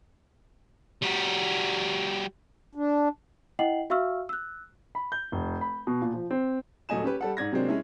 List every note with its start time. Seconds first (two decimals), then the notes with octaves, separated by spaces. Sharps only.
1.03 G3 F#4
2.75 D4
3.59 E4 D#5 F#5 G5 C7 F#7
3.90 F#4 E5 F5 C#6 E6 F6
4.29 E6 F#6
4.95 B5
5.12 G6
5.32 F1
5.61 B5
5.87 B2
6.02 A#2
6.14 F3
6.31 C4
6.89 D#1 F#3 A3 D#5 G#5 E7
7.04 C#4 G4 B4
7.21 G3 A4 F#5
7.37 G#2 D5 G#6 A#6
7.52 C3 F#3 G#3 A#3 C4 D4
7.68 G#3 C#4 E4